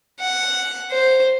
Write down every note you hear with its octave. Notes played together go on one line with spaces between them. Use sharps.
F#5
C5